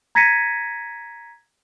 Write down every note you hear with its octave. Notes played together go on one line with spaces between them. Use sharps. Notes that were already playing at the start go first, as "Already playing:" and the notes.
A#5 G#6 A#6 B6 C#7 D#7